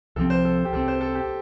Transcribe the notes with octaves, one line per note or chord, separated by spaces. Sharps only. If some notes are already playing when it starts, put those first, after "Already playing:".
C2 C3 F3 C4 A4
C5
A4
G4
C2 C3 F3 C4 A4
C5
A4
G4